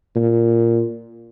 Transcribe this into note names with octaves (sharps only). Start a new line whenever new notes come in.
A#2